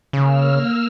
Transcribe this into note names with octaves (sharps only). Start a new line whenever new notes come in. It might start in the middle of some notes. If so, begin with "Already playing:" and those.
C#3 A#3 E6 F6